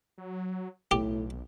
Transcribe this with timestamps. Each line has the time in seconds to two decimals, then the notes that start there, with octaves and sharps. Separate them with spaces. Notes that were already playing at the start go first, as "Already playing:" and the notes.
0.18 F#3
0.91 B1 A2 G4